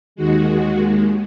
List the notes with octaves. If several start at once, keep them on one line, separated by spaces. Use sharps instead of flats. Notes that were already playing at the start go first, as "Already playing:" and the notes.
D#2 D#3 G#3 F#4